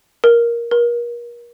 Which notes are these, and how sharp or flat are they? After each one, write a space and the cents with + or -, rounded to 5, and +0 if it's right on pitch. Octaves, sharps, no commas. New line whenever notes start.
A#4 +10
A#4 +35